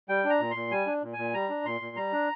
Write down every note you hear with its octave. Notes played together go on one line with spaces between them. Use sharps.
G3 G5
D4
A#5
A#2
A#2 C6
G3 G#5
D4
A#2
A#2 G#5
G3 A#5
D4
A#2 C6
A#2
G3 A#5
D4